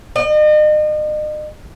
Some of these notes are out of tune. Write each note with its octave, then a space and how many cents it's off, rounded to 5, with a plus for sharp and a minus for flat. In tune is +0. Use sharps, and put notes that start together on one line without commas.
D#5 -40